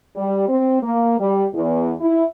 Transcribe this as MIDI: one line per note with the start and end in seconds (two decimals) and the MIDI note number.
0.16 0.46 55
0.49 0.80 60
0.83 1.17 58
1.19 1.45 55
1.54 1.92 40
2.00 2.25 64